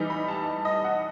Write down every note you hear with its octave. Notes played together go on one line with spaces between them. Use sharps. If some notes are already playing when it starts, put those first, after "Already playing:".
Already playing: E3 G3 D#4
B5
A5
A5
D#5
F#5